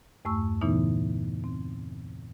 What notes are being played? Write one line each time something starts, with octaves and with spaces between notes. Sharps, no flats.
E2 G2 A3 C#6 E6
A#2 C#3 E3 B3 D#4 E4
C4